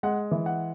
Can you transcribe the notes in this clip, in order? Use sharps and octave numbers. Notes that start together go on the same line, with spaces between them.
G#3 F#5
E3
F#5